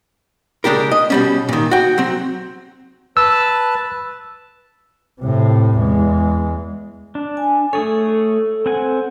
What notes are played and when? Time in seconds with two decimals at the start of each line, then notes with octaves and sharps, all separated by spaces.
0.64 C#3 G#3 D4 G4 A#4
0.91 D#5
1.10 B2 G3 C#4
1.49 A#2 D#3
1.71 F#4 G5
1.98 F#3 C4
3.17 B4 A5 E6
5.21 A2 C3
5.78 E2 G#3
7.15 D4
7.37 G#5
7.73 A3 G#4 A4 C#5
8.66 C4 F#5 G#5